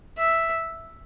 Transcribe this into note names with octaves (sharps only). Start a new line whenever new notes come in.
E5